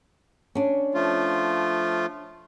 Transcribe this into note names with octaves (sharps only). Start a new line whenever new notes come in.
C#4 D4
F3 A3 F4